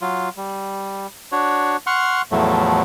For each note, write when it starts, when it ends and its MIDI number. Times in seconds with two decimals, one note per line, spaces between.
0.01 0.29 54
0.01 0.29 65
0.37 1.07 55
1.32 1.77 62
1.32 1.77 66
1.32 1.77 73
1.87 2.22 78
1.87 2.22 84
1.87 2.22 85
1.87 2.22 89
2.32 2.82 40
2.32 2.82 45
2.32 2.82 53
2.32 2.82 54
2.32 2.82 57